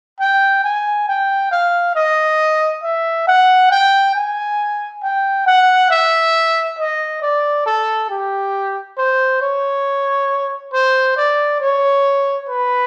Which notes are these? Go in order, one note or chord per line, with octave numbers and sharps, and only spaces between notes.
G5
G#5
G5
F5
D#5
E5
F#5
G5
G#5
G5
F#5
E5
D#5
D5
A4
G4
C5
C#5
C5
D5
C#5
B4